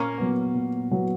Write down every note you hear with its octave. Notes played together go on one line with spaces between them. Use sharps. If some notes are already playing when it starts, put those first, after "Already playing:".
Already playing: A#2 A#3 C#4
F#3 B3
A#2
F#3 B3